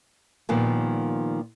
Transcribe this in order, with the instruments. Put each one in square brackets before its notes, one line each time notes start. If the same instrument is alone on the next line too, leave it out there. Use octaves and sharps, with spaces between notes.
[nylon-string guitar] A#2 D#3 F3 G3 B3